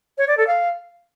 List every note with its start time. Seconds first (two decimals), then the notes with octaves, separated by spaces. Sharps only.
0.18 C#5
0.27 D5
0.37 A4
0.47 F5